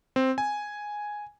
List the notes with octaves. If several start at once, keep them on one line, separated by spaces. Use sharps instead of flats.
C4
G#5